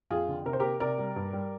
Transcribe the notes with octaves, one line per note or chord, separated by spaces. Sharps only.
F2 F4 G#4
D3
C3 A#4
C5
A#3 G4 A#4
C3 A#4 D5
G3
G2
G3